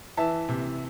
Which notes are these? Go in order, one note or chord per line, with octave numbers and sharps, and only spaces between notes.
E3 E5 A5
C3